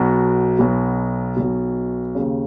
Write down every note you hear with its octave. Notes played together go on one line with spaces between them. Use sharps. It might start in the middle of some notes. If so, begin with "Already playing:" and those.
Already playing: B1 B2 F#4
B1 B2
B1 B2
D#2 C#3